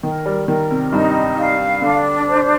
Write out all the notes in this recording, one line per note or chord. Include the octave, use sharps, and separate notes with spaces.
D#3 A#4
G3
D#3 A#4
C3
G2 D#4
F5
D3 D4
C5